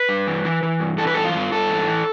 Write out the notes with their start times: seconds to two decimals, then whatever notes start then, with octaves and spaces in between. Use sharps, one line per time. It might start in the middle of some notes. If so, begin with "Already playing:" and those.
Already playing: B4
0.09 G2
0.27 E3
0.44 E3
0.63 E3
0.80 G2
0.98 E3 A4
1.07 B4
1.14 G2 A4
1.25 F4
1.34 G2
1.52 G2 A4
1.70 E3
1.88 E3